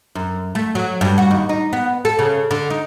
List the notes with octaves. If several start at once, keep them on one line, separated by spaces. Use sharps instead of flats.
F#2
A3
F#3
G2
F#4
D#2
D#4
B3
A4
C#3
D3
D#4